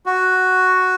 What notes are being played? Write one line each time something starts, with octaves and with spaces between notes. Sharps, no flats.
F#4